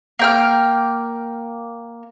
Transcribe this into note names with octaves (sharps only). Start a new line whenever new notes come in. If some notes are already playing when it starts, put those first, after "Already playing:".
A#3 G5 F6